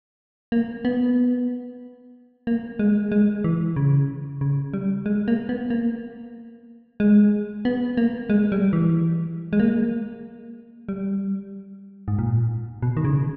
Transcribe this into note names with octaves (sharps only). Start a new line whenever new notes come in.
A#3
B3
A#3
G#3
G#3
E3
C#3
C#3
G3
G#3
A#3
B3
A#3
G#3
B3
A#3
G#3
G3
E3
G#3
A#3
G3
G#2
A#2
B2
D#3
C#3